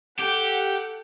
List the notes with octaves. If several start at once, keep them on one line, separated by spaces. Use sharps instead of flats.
G4 A4 F#5